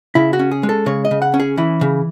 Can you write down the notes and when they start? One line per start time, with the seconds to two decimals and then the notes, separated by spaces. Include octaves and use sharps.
0.15 C#3 E4
0.33 F#4
0.39 C#4
0.51 G#4
0.63 G#3
0.69 A4
0.86 C#3 C#5
1.05 D#5
1.11 C#3
1.22 F#5
1.34 C#4
1.40 G#4
1.58 E3 E4
1.81 C#3